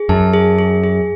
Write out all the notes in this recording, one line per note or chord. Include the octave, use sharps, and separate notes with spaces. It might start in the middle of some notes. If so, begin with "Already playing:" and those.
Already playing: G#4
F#2 A5
G#4
G#4
G#4